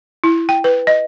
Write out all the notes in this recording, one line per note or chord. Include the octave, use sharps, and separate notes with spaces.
E4
G5
B4
D#5